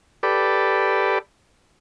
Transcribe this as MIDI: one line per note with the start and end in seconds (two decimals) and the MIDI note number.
0.23 1.19 67
0.23 1.19 69
0.23 1.19 71
0.23 1.19 74